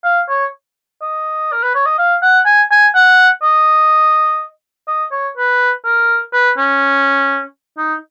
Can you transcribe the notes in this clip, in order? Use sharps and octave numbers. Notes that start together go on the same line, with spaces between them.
F5
C#5
D#5
A#4
B4
C#5
D#5
F5
F#5
G#5
G#5
F#5
D#5
D#5
C#5
B4
A#4
B4
C#4
D#4